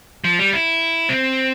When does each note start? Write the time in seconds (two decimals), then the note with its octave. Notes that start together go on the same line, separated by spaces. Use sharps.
0.24 F3
0.39 G3
0.53 E4
1.09 C4